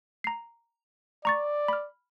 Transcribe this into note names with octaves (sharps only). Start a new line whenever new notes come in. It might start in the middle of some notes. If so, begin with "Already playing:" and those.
A#5 C7
D5 A#5 C#6 A6
B5 F6